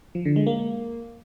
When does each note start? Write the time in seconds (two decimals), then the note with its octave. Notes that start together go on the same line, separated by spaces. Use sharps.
0.15 F3
0.25 D3
0.36 G#3
0.47 A#3